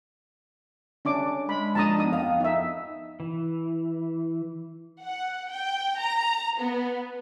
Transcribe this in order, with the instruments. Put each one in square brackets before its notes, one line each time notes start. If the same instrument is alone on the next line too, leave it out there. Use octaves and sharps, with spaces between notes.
[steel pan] C#4 D4 D6
[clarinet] G#3 [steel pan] B5
[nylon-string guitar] F3 D4 D#5 [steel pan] A5 A#5 D#6
[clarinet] B3 [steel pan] D#4 D#6
[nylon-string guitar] F2 F4 F5
[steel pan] D#4 E5
[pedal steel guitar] E3
[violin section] F#5
G5
A#5
B3